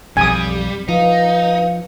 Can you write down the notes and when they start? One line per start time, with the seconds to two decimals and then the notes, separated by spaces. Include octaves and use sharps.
0.17 B1 F2 G3 G#5 D#6
0.88 F3 D#4 B4 F5